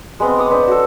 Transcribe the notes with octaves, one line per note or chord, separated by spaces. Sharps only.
G#3 B3 C4
C#5 D6 D#6
C#4 D4 B4 C5
F#4 A4